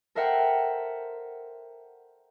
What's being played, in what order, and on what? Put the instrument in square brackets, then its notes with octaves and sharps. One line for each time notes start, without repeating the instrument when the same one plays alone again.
[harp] A4 A#4 C5 E5 F#5 G5